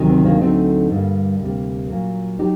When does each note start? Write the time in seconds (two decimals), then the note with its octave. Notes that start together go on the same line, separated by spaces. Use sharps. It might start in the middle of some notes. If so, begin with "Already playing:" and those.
Already playing: D2 C3 D#3 F#3
0.09 C4
0.25 A#3 D4
0.41 D2 D3 F#3 A3 C4 D#4
0.91 G2 D3 G3 A#3
1.40 D2 C3 G3 A#3
1.90 A#2 F#3 A#3
2.39 F#3 D#4 G4